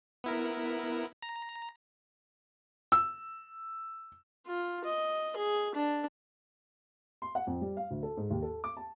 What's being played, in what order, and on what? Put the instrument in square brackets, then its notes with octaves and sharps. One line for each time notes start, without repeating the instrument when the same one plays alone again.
[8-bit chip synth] B3 E4 A#4
A#5
[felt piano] E6
[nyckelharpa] F4
D#5
G#4
D4
[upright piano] C6
F#5
F2
G3
F5
D2
A4
G#2
D#2
A4
D6
A5